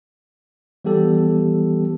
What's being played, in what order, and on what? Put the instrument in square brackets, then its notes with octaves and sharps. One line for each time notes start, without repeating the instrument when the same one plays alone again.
[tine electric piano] E3 G3 B3 G4 A4